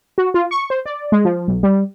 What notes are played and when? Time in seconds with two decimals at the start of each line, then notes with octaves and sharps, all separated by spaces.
0.18 F#4
0.34 F4
0.51 C#6
0.70 C5
0.86 D5
1.12 G#3
1.25 F3
1.48 B1
1.63 G3